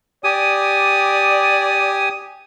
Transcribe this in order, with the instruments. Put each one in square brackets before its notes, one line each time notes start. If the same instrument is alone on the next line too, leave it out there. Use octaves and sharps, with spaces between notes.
[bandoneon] G4 G#5 D#6 [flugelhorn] D5